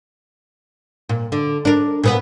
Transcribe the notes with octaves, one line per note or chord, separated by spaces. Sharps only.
A#2
D3
D4 A#4
A#2 B3 B4